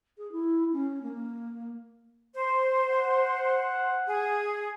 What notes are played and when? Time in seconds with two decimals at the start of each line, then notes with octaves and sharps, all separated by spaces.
0.18 G#4
0.32 E4
0.73 C#4
1.02 A#3
2.33 C5
2.90 F#5
4.06 G#4